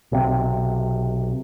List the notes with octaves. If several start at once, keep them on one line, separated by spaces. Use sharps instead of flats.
B1 C3